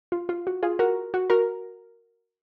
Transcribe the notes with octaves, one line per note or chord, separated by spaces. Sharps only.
F4
F4
F#4
F4 G#4
F#4 A#4
F#4
F#4 A#4